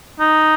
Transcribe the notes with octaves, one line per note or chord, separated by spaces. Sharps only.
D#4